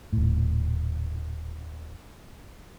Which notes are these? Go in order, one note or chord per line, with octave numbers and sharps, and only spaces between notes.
D#1 A2